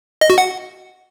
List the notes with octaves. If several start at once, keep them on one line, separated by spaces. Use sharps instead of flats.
D#5
F#4
F#5